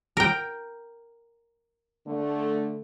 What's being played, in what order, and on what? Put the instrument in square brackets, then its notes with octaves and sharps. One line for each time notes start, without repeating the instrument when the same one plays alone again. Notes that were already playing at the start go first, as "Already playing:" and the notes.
[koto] A#4 G5
[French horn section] D3 A3